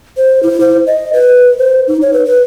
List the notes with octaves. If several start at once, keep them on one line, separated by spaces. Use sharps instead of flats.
C5
E4
C5
D#5
B4
C5
D#4
C#5
B4
B4